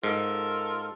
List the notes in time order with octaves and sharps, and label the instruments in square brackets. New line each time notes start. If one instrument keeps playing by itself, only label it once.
[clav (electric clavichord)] G#2 [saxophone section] F4 A4 A#4